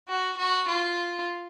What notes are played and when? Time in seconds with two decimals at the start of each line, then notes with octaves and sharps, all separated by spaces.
0.08 F#4
0.37 F#4
0.68 F4